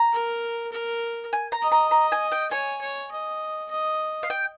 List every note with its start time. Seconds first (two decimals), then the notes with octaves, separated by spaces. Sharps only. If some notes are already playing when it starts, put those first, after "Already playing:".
Already playing: A#5
0.12 A#4
0.72 A#4
1.33 G#5
1.52 A#5
1.62 D#5
1.72 A#5
1.91 A#5
2.12 G#5
2.32 G5
2.51 C#5 G#5
2.81 C#5
3.11 D#5
3.70 D#5
4.23 F5
4.30 G5